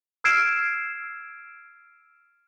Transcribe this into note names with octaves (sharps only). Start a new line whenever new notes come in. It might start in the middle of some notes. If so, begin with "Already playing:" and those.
E6 F6 G#6 C7 D7 E7